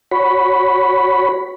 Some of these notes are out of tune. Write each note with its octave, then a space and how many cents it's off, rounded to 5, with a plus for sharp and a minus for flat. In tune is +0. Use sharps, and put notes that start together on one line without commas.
F#4 +0 C#5 +0 B5 +0